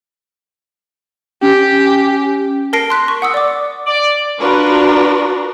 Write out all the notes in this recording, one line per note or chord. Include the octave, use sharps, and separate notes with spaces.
C#4 G4
A#4 A5 A#6 C7 D7
C6 F#6 B6
C#6
F#5 D#6 E6
D5 D6
D5
D4 F4 F#4 A#4 B4